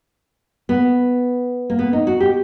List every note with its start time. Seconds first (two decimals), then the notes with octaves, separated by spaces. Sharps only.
0.69 B3
1.70 A#3
1.79 B3
1.93 D#4
2.07 F#4
2.20 G4